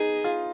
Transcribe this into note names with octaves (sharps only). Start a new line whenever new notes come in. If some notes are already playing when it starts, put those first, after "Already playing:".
Already playing: B3 D#4 G#4
F4